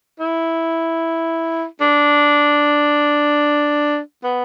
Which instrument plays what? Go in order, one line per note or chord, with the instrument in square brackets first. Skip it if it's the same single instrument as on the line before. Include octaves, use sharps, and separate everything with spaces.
[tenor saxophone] E4
D4
B3